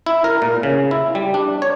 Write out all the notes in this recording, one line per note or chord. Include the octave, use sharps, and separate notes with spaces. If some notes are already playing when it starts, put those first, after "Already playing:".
E4
A#4
A#2
C#3
E4
G3
D4
C#5